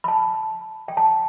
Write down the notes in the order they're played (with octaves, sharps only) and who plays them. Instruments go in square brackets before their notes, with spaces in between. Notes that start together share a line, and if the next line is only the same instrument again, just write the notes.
[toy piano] B5
A5
G5
A5